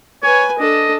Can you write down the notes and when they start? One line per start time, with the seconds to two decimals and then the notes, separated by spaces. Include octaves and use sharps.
0.23 B4 C#5 G#5
0.59 D4 A4 D#5